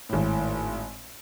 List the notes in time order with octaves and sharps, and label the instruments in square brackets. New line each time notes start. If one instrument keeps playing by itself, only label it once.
[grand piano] G#1 A2